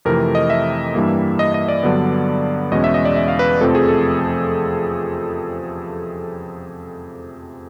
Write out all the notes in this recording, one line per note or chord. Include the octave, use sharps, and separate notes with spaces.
F2 C3 E3 A3 A#4
D#5
E5
G2 E3 G3 A#3
D#5
D#5
D5
G2 D3 F#3 B3
E2 B2 G#3 C#4 D#5
E5
D#5
D5
E5
F5
B4
F2 C3 F3 A3 C4 A4
G#4
A4